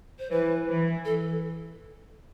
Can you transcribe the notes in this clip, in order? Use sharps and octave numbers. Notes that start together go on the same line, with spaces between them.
C5
E3 B4
E3
A4